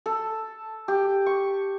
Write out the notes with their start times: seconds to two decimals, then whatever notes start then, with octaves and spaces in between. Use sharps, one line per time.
0.06 A4
0.88 G4
1.26 C#6